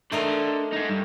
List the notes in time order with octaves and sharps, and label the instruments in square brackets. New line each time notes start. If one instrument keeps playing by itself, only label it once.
[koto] A3 D#4 A#4 [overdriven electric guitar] D4 C6
[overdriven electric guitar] G#3 D#4
G2